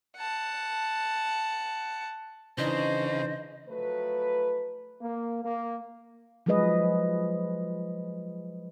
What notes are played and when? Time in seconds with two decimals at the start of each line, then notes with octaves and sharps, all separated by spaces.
0.17 F#5 A5
2.58 C#3 E3 D4 D#4 C5 D#5
3.68 F3 F#3 A3 B4
5.00 A#3
5.44 A#3
6.46 F3 F#3 G#3 G#4 B4 D#5